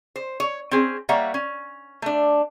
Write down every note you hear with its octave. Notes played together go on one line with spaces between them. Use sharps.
C5
C#5
C4 C#4 G#4
G3 A#3 C#5 E5 F#5
C#4
A3 D4